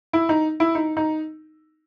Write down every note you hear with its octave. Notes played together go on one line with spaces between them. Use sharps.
E4
D#4
E4
D#4
D#4